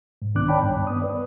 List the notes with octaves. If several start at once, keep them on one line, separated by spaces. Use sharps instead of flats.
G#2
C2 D#3 B3 D4 D6 F#6
C#5 D5 G5 A5 B5
G2
B3 D#6
B4 D5